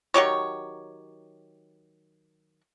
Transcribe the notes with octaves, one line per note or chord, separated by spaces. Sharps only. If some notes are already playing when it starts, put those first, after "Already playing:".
D#3 F#3 G4 C#5